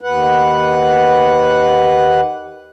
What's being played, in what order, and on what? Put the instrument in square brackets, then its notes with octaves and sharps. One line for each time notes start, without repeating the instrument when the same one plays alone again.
[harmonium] D#2 B4 F#5